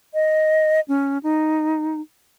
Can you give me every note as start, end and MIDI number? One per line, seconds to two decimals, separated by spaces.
0.14 0.80 75
0.88 1.18 61
1.23 2.01 63